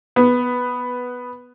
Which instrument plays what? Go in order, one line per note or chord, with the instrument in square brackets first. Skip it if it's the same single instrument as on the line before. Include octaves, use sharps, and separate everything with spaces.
[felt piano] B3